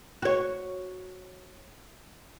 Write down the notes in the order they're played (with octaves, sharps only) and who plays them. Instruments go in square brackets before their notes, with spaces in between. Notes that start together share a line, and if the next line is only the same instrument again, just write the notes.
[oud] F#4 C#5